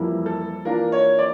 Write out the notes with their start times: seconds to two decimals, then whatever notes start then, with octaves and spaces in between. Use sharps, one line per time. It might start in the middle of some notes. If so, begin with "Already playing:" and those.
Already playing: F2 E3 G3 A#3 E4
0.26 A4
0.65 E3 A#3 D4 F4 A#4
0.92 C#5
1.19 D5